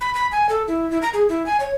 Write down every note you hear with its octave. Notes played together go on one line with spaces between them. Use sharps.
B5
B5
G#5
A4
E4
E4
A#5
G#4
E4
G#5
C#5